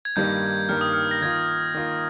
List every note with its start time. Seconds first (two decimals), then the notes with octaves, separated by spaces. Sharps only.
0.05 G#6
0.16 G2 D#3 G3 A#3 D#4 G6
0.69 G2 D#3 G3 A#3 D#4 F6
0.81 D#6
0.93 F6
1.11 A#6
1.22 D#3 A#3 F4 G#6
1.75 D#3 A#3 F4